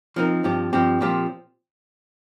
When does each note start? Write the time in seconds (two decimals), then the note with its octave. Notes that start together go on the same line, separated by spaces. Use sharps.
0.16 F3 C4 D#4 A#4
0.44 G2 F3 C4 G4
0.73 G2 F3 C4 G4
1.01 A#2 F3 C4 G4